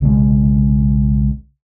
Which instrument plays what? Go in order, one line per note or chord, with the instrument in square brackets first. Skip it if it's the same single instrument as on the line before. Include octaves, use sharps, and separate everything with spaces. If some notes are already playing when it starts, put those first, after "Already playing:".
[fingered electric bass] B1 C#3 F#3 G#3